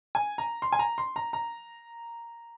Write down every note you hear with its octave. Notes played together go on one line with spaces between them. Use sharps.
G#5
A#5
C6
G#5
A#5
C6
A#5
A#5